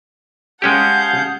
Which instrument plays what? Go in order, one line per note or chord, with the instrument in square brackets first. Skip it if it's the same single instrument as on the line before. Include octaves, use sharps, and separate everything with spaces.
[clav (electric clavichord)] G#3 C#4 G4 [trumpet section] G#4 F5 A5 [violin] F#5 G6